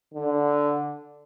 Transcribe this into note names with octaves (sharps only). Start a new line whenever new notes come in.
D3